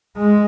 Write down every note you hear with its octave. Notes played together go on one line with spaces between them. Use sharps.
G#3